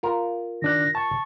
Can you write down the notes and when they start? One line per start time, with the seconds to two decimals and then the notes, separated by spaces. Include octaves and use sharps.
0.03 F4 A#4
0.62 D#3 D4 F#6 A#6
0.95 A5 C#6